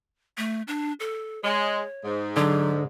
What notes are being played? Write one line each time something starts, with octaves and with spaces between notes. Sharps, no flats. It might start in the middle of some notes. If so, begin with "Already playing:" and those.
A3
D4
A4
G#3 C#5
G#2
D3 F#3